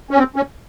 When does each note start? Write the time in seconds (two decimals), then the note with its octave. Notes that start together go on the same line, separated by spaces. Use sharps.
0.11 C#4
0.18 C4
0.36 C#4